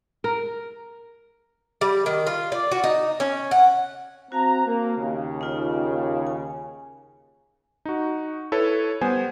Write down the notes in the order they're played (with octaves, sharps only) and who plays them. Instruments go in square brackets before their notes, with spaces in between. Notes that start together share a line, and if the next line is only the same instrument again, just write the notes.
[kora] A#4
[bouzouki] G3
D#3
F4
D5
F#4
D#4
C#4
F#5
[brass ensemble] C4 A#5 [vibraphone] F#4 F5 A5
[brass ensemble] A#3
D#2 C#3
[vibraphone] D#4 F4 D#5
G#5
[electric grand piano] D#4 F#4
E4 A4 B4 C#5
G3 B3 C5 G#5